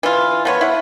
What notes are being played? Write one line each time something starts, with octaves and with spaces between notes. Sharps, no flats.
E3 F4
F3 B3 C#5
E4 F#5